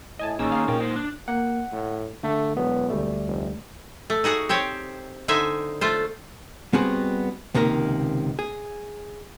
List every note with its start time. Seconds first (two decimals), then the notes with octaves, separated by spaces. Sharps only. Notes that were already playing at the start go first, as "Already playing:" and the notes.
0.19 A2 D#5 G#5 A5
0.39 A1 D#3 A#3 C#4 D#4 G#4 E6
0.52 F5 C6
0.68 A#2 A#3 F4 G5
0.80 D#4 C5 C6
0.96 D4
1.28 A#3 F#5
1.72 A2
2.23 D3 A3
2.57 E1 F#3 B3
2.90 D2 G3 A3
3.27 F1
4.10 A3
4.24 D#4 F#4 G#4 F#5
4.49 C4 G4 C5 C#5
5.28 D3 D#4 C5 E5 G#5
5.81 A3 F4 C5
6.73 G3 B3 C4 F#4 G#4
7.55 C#2 C3 D#3 A#3 A#4
8.39 G#4